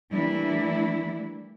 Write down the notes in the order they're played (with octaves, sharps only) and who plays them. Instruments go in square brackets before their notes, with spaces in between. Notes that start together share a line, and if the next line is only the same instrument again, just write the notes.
[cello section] E3 G3 A3 A#3 D4 E4